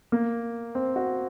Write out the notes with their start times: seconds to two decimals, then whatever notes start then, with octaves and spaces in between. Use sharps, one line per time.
0.12 A#3
0.75 C4
0.96 F#4